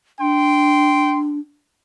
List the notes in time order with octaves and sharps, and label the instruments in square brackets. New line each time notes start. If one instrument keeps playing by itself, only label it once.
[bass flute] D4 [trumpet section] G5 C6